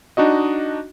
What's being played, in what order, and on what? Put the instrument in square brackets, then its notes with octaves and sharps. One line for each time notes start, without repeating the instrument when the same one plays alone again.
[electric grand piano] D4 D#4 F#4 D#5